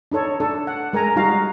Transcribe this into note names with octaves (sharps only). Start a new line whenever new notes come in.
D4 D#4 A4 C#5
D4 A4
F#5
G#3 A#4 G#5 A#5
G3 D#4 F#4 F5 A#5